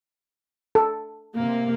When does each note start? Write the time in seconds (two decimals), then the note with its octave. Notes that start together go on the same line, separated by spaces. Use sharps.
0.75 A4
1.35 C3 A#3